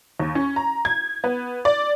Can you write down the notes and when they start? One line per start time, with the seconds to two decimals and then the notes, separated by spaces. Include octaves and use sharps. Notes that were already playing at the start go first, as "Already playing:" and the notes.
0.20 D#2
0.35 C#4
0.56 A#5
0.85 G#6
1.24 B3
1.65 D5